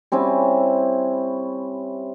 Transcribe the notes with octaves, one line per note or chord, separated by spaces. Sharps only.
G3 C4 C#4 E4